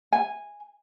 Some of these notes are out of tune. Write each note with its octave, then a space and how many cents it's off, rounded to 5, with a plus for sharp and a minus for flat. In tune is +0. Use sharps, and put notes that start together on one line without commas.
G#5 -10